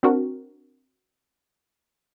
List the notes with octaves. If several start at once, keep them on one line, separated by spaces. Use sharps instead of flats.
C4 D4 F#4 A#4